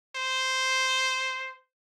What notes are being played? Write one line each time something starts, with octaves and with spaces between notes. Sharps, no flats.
C5